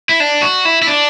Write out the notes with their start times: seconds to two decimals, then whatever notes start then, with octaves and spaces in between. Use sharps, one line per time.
0.09 E4
0.20 D4
0.42 F#4
0.65 E4
0.82 E4
0.87 D4